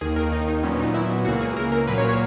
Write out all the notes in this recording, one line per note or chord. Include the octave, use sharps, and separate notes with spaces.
D#2 D#3 A#3 G#4
A#4
D#4
D#4
A#2 F#3 B3 C#4
D#4
E4
C#2 C#3 E3 A#3 F#4
G#4
A#4
A#4
A#2 F#3 A#3 B4
C#5
C#5